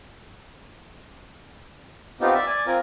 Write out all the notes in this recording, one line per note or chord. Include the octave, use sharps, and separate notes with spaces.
B3 C4 D#4 F4 G4
D5 E5
D5 G#5
C4 F4 A#4 G#5